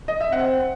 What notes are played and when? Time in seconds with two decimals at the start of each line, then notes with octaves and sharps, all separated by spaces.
0.08 D#5
0.21 E5
0.32 C4 F#5